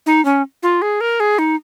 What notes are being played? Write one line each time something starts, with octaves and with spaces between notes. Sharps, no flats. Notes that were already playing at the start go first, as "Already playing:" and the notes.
D#4
C#4
F4
G#4
A#4
G#4
D#4